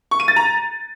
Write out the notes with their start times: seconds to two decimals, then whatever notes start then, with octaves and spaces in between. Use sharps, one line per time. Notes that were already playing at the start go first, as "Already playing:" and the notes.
0.11 C#6
0.20 D#7
0.28 A6
0.36 A#5